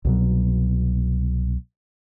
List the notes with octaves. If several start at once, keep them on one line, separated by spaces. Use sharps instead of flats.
C2 B2 F#3